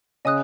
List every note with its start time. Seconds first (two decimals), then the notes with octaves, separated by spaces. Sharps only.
0.25 C#3 D#5 G#5 D#6 F#6